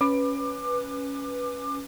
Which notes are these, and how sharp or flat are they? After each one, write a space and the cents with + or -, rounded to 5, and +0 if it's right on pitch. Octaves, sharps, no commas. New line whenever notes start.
C#4 +5 B4 +0 D6 +25